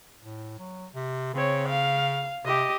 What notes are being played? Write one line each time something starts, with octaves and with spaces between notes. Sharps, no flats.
A2
F#3
C3
C#3 C4 C#5
F5
C3 G4 D#5